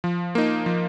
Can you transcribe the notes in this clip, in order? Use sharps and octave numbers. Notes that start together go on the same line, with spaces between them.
F3
A#3 D#4
F3